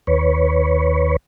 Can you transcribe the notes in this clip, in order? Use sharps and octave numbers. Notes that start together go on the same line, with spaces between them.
D#2 B4 C#5